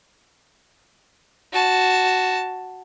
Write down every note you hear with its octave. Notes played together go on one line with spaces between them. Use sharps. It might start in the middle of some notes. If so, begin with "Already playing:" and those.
F#4 A5